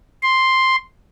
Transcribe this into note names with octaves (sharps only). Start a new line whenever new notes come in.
C6